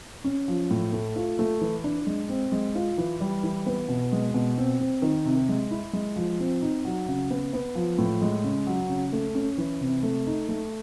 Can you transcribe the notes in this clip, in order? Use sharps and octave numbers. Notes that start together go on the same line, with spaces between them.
C#4
F3
A2
A3
F4
A3
E3
D4
G#3
C4
G#3
F4
E3
G3
E3
B3
B2
G#3
B2
C4
C4
D#3
C3
G#3
E4
G#3
F3
C4
D#4
F#3
C#3
B3
B3
F3
A2
G#3
C#3
F#3
C#3
A3
C#4
E3
C3
A3
D#4
A3